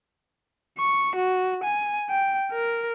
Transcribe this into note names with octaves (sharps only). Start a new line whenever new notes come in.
C#6
F#4
G#5
G5
A#4